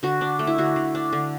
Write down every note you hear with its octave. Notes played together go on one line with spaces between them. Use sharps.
D3 F#4
D4
A3
E4
D3 F#4
D3
D4
D3